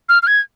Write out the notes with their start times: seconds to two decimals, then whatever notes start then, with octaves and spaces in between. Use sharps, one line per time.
0.09 F6
0.23 F6
0.27 G#6